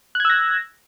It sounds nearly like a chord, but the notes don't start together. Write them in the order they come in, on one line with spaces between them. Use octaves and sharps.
F#6 G#6 E6 A#6